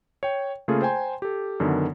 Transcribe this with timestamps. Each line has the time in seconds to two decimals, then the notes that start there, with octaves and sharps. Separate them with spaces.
0.23 C#5 G5
0.68 C#3 A3 A#3 F4 G#4 A4
0.82 C5 G5 G#5 A#5 C6
1.22 G4 A4
1.60 F#2 D3 D#3 B3